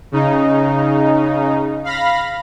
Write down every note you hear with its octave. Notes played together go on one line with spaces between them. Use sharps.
C#3 D#4
F5 B5 A#6